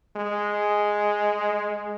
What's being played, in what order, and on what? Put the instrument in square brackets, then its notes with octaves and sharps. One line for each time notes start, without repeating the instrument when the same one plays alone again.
[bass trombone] G#3